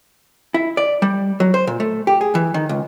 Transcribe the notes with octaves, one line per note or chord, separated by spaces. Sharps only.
E4
D5
G3
F#3
C5
A#2
A3
G4
G#4
E3
D#3
C#2